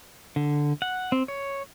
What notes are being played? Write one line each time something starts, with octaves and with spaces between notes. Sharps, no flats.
D3
F#5
C4
C#5